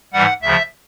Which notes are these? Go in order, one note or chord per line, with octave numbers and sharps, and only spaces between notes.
G#2 E3 G3 F#5
D2 C#3 F3 E5